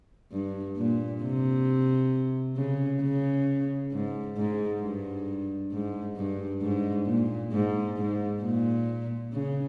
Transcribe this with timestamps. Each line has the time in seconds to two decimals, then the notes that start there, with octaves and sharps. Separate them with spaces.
0.32 G2
0.77 A#2
1.22 C3
2.57 C#3
3.01 C#3
3.92 G#2
4.37 G#2
4.81 G2
5.72 G#2
6.17 G2
6.62 G#2
7.06 A#2
7.52 G#2
7.97 G#2
8.42 A#2
9.32 C#3